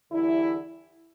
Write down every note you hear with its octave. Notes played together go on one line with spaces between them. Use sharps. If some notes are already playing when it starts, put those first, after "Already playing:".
E2 D3 G3 E4